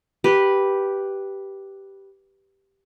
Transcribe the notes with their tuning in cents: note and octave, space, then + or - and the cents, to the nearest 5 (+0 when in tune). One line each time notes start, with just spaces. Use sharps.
G4 -5 B4 -5